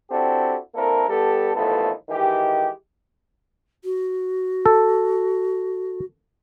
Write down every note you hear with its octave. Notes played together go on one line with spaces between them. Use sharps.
C4 D4 E4 F#4 G4 A4
A#3 C4 D4 E4 A4 A#4
G3 B3 G4 A4
A1 D#2 F3 A3 B3 A4
D#3 E3 G#3 G4
F#4
A4